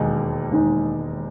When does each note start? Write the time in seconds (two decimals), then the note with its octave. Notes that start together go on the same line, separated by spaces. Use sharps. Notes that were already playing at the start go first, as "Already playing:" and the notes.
Already playing: E1 D#2 D#3 G#3 D#4
0.51 E1 D#2 D#3 G#3 D#4